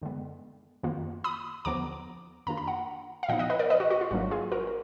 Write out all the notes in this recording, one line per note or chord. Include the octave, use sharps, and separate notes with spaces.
F#2 D3 G#3 B3
F#2 D#3 A#3 F4
B5 D#6
D#2 D3 F3 B3 A#5 D6
F#2 D#3 A#3 D4 F4 A#5
B5
F#5 A#5
F5
A#2 F3 B3 D#4 D#5 F#5
D#5 F#5
B4 D#5
A#4 D5
B4 D#5
F#4
F#4
F4
G#1 G#2 F#3 A#3 D4 F#4
F4 G#4
F#4 A#4
A#4